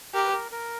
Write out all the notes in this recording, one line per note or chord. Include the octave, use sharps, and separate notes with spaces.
G4 A#4
B4
A#4
A#4